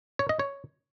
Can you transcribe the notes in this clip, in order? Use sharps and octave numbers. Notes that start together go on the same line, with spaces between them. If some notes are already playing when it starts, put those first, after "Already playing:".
C#5
D#5
C#5